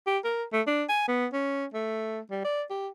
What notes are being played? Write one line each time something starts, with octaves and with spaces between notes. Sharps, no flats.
G4
A#4
A3
D4
G#5
B3
C#4
A3
G3
D5
G4